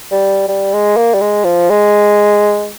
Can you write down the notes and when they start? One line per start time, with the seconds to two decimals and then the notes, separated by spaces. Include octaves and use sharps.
0.12 G3
0.48 G3
0.73 G#3
0.97 A#3
1.14 G3
1.21 G#3
1.45 F3
1.70 G#3